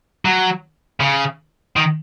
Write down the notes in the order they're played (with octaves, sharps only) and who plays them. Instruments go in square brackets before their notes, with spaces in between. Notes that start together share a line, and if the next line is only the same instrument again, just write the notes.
[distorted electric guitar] F#3
C#3
D#3